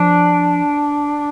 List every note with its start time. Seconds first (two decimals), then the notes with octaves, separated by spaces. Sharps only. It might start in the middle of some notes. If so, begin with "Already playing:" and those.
Already playing: F3 D4